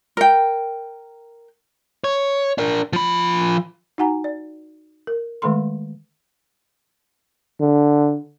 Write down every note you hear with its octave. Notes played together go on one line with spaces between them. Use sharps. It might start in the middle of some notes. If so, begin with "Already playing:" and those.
A#4 G5
C#5
D4 A#4
F3 B5
D#4 F#4 F#5 G#5 A#5
D5
A#4
D#3 G#3 A3 A4 B5 C6
D3